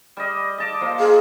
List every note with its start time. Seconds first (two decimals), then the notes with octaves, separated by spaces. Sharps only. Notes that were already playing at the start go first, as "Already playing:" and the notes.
0.17 G3 D5 D#5
0.58 D#5 A5 D6
0.81 F3 A#3
1.00 F4 G#4